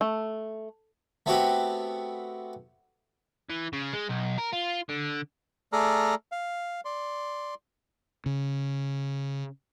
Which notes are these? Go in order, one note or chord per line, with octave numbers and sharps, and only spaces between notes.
A3
A3 B3 C4 F#4 G4 B4
E3
C#3
G#3
B1
A#4
F4
D3
A3 G#4 A4 D5 A#5 F6
F5
D5 C6
C#3